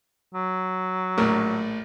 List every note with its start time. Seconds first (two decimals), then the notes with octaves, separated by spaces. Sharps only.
0.34 F#3
1.18 A#1 A2 A#4